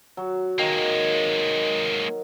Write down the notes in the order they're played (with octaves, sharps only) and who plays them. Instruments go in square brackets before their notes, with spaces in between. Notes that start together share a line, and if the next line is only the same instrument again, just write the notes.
[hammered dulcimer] F#3
[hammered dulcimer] D#3 [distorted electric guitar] G#3 A#3